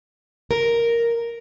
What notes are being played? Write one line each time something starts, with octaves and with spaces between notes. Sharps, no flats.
A#4